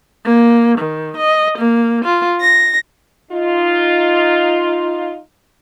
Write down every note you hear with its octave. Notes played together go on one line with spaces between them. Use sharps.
A#3
D#3
D#5
A#3
F4
A#6
D#4 F4